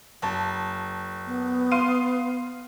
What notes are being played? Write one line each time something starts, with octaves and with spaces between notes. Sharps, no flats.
F#1 A5
B3
F5 C6 D#7